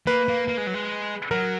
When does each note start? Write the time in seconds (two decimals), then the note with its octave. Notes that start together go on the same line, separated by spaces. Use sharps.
0.07 A#3 B4
0.28 A#3
0.48 A#3
0.57 G#3
0.67 F#3
0.74 G#3
1.31 F#3 A#4